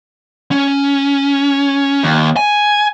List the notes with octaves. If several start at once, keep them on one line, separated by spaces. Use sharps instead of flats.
C#4
D#2
G#5